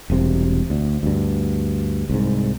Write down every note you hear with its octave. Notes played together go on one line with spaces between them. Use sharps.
E1 C2 C3
D2
D2 G2
C2 G#2